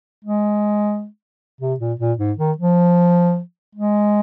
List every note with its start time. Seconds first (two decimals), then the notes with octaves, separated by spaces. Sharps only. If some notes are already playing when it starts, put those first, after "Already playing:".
0.25 G#3
1.61 C3
1.80 A#2
2.00 A#2
2.19 G#2
2.39 D#3
2.58 F3
3.75 G#3